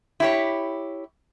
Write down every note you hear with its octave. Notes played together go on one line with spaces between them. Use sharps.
E4 G4 C#5